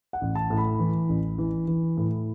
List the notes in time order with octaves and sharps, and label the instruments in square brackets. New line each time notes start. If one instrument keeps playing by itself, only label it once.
[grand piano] F#5
A1
A5
A2
B5
E3
A1
E3
E3
A2